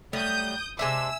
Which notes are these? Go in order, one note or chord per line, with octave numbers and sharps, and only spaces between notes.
F#3 G3 A3 D#6 G6
C3 G#3 D4 E5 G#5 E6